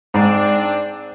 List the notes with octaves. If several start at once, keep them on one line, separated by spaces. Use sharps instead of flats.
G#2 C4 D4